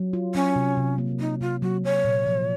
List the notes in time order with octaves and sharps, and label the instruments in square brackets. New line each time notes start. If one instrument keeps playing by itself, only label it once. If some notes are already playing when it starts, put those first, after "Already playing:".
Already playing: [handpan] F#3
F4
[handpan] F#3 [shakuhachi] C#4
[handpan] C3
C3
A#3
[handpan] A#3 [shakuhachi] D#4
[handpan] C3 [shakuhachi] F4
[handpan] F#3 [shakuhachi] F#4
[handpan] F#3 [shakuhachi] C#5
[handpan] A#2
F3